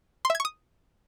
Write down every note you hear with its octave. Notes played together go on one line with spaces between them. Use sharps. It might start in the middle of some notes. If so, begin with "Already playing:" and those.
C6
E5
G#6
C#6
D#6